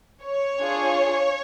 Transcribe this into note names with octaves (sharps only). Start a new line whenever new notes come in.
C#5
D4 F4 G#4